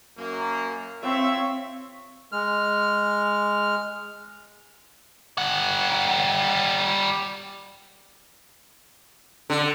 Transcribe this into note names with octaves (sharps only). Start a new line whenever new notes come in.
F#2 A#3
C4 F4 C#5 E5
G#3 F6
G3 F#5
D3